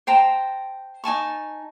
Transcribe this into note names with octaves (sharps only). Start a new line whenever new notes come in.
C5 G5 A5 A#5
D#4 G#5 A5 C#6